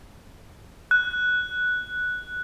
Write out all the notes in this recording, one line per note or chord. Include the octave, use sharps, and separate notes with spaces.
F#6